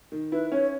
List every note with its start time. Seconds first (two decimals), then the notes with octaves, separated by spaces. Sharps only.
0.12 D#3
0.32 E4 B4
0.52 C#4 C#5